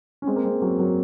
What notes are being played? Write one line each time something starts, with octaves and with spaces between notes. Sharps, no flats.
C#4
G#3 C4
A#3
G#3 C4
F#3 A#3
F#3 A#3